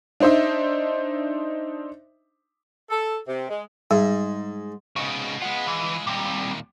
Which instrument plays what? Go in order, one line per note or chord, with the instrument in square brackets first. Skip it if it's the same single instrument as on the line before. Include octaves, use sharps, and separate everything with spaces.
[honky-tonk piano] D4 D#4 C5 D#5 E5
[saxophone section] A4
C3
G#3
[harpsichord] G#2 [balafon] G3
[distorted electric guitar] G#2 C#3 [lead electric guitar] F#4 D#5
[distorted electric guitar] G#3 F4 [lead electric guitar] B4 F#5
[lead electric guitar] E3
[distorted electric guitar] D#2 A#2 [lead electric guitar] G3 C4